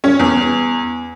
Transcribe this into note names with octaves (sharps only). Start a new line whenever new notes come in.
C#4
E2